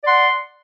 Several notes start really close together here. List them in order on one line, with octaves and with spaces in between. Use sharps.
D5 C6 F#5